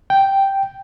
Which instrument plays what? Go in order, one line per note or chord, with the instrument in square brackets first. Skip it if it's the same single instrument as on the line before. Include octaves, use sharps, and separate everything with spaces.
[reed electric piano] G5